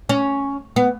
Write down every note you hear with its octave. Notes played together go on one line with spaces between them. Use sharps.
C#4
B3